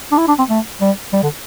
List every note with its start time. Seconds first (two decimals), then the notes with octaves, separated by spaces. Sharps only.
0.12 D4
0.18 E4
0.28 D4
0.38 C4
0.50 A3
0.81 G3
1.13 G3
1.23 D3